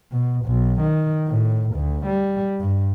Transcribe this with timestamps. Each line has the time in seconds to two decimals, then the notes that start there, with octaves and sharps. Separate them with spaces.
0.11 B2
0.46 B1
0.81 D#3
1.28 A2
1.75 D2
2.06 G3
2.60 G2